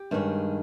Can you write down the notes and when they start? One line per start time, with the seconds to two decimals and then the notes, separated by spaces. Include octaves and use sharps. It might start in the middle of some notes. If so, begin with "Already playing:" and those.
Already playing: G4
0.11 G2 D#3 G#3 C#4